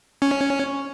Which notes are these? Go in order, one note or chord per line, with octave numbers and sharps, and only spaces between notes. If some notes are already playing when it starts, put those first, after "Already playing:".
C#4